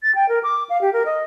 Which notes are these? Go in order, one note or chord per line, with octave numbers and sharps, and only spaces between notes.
A6
G5
A#4
D6
F5
G4
A#4
D#5